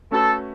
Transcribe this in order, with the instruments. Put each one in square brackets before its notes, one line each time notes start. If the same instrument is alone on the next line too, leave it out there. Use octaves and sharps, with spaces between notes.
[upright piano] A3 C#4 F#4 B4 [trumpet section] A4